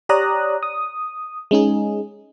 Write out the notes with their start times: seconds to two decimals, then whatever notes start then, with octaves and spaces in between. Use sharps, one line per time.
0.09 G4 C#5 D5 A#5 D#6 F#6
0.63 D#6
1.51 G#3 C#4 D#4 G#4